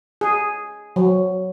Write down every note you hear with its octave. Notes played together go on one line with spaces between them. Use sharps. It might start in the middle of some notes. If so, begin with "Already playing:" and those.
G#4
F#3